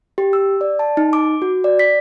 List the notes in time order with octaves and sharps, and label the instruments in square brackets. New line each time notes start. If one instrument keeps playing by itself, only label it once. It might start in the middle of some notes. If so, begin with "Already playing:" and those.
[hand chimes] G4
E6
D5
A5
D#4
D6
F#4
D5
B6